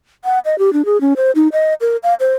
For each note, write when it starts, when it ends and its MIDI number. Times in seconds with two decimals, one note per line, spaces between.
0.25 0.39 78
0.45 0.58 75
0.59 0.73 67
0.73 0.85 62
0.85 1.00 68
1.01 1.14 61
1.16 1.31 72
1.35 1.48 63
1.52 1.74 75
1.81 1.97 70
2.03 2.14 77
2.20 2.34 72